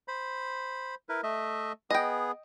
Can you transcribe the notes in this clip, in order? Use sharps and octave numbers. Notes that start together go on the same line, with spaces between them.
C5 B5
E4 A#4 B4
A3 D#5 E5
B3 G#4 D#5 G5